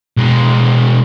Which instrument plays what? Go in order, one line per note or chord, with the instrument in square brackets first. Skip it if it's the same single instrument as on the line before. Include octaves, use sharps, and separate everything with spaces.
[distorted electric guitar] B2 G#3